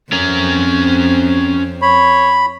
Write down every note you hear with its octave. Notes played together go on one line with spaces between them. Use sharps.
F2 C4 C#4 A#4
C#5 B5